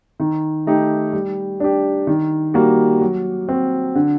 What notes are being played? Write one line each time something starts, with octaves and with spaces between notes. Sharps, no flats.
D#3
A3 D#4 G4
G3
D4 G4
D#3
G3 A#3 F#4
F#3
C4 F#4
D3